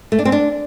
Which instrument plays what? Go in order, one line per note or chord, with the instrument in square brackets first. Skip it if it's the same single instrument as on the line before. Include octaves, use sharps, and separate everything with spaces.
[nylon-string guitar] A3
D4
C4
D4